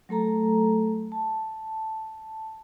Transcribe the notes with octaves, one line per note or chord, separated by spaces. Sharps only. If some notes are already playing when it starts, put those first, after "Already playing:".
F#3 A3 A4 A#5
A5